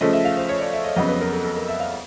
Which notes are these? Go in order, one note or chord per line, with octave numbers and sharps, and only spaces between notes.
C#3 F3 A3 D#5
E5
F5
C5
C#5
D5
E5
D#5
F2 C#3 F#3 B3 D#5
B4
A#4
A4
A4
A#4
E5
F5